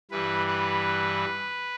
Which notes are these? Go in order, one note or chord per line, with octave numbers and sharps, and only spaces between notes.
G2 E3 G3 B4
B4